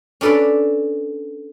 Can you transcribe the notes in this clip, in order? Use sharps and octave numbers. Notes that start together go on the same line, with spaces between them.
C#4 D4 A4 B4 D5